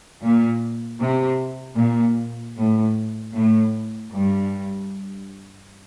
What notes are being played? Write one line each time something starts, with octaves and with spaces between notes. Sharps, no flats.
A#2
C3
A#2
A2
A2
G2